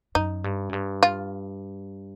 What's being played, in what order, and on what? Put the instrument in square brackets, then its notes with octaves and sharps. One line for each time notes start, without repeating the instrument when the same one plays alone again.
[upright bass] F#2 [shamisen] D#4
[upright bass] G2
F#2
G2
[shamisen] F4